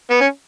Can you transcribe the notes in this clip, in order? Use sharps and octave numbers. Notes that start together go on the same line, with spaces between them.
B3
C#4